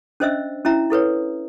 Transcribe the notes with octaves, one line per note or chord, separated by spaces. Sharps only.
C#4 D4 C5 D#5 E5 E6
C#4 E4 E5 A#5
E4 A4 B4 C#5